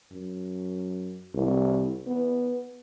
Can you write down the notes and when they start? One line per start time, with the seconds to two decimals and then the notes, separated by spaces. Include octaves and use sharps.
0.11 F#2
1.34 C2
2.07 B3